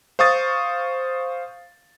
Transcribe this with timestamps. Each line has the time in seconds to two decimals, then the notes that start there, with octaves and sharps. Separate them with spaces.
0.19 C5 F5 C#6 D#6 A6